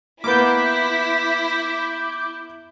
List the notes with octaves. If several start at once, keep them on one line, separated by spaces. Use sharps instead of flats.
A#3 B3 E4 D6 G6 B6